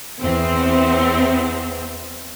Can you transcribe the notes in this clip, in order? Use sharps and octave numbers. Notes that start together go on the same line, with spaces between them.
E2 C4